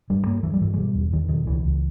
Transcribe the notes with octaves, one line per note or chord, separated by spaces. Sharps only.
G2 G3
G2 A#3
G2 E3
G3
G2 E3
G#3
B2 G3
E2
E2 D#3
B2 D#3
C#2 E3
C#2